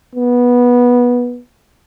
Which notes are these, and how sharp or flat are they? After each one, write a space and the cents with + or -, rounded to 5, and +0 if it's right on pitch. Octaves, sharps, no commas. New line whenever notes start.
B3 -15